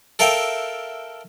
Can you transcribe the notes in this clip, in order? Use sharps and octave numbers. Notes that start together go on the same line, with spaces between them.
A4 A#4 E5 F5 G5